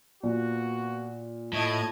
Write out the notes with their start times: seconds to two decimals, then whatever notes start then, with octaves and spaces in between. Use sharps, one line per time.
0.23 A#2 A#3 B3 F#4
1.53 A2 A3 E4 D#5 A5 G#6